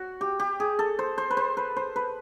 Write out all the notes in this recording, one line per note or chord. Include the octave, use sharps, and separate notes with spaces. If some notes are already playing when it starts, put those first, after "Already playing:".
Already playing: F#4
G4
G4
G#4
A4
C5
C5
B4
C5
B4
C5
B4